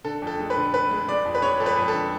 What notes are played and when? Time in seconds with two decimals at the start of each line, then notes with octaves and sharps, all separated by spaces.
0.04 D3 A4
0.22 F2
0.27 A4
0.40 G#3
0.50 B4
0.57 D3
0.73 D3 B4
0.91 G#3
1.08 G#3 D5
1.25 F2
1.35 B4
1.42 G#3 C#5
1.60 F2 A4
1.66 B4
1.77 F2
1.88 A4
1.94 D3